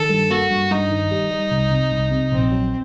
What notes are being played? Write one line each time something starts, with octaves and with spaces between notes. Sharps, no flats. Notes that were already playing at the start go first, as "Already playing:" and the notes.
Already playing: D#3 A4
G2
A#3 F#4
G2
G2 D#4
D#3
G3
G3
C2
C3
C2
C3
A#1 C4
F#3